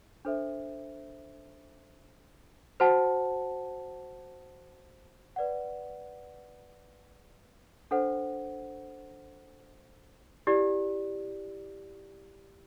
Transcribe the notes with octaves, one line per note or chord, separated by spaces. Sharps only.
D4 A4 C5 E5
F#4 C5 F#5 A5
B4 D5 F#5
D4 A4 C5 F#5
E4 G4 D5